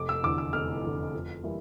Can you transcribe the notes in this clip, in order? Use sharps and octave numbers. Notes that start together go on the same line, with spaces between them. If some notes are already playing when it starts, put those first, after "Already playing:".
Already playing: F1 D6
E6
E2 D3 D6
E6
F1 F6
E2 D3
F2
E3 G3 A#3 E4